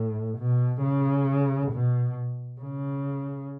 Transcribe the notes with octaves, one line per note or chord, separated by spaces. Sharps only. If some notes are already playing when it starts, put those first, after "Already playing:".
Already playing: A2
B2
C#3
B2
C#3